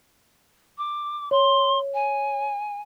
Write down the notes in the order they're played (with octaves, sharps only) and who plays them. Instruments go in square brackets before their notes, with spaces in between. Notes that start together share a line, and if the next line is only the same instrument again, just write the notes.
[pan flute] D6
[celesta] C#5 [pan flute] C6
[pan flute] G#5